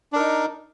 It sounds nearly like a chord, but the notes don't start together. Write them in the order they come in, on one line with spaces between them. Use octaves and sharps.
D4 A#4 D#4